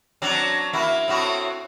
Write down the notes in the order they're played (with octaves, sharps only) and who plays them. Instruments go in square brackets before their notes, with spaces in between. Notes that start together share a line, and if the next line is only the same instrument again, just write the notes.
[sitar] F#3 C4 D4
A#3 E4 F#4
A2 C4 F#4